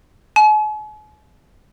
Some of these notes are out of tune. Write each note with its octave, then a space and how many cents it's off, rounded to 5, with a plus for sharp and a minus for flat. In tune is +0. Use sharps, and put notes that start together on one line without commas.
G#5 +45